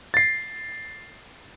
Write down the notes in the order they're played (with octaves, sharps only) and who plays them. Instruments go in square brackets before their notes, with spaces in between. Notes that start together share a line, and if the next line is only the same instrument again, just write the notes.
[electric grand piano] A6 C7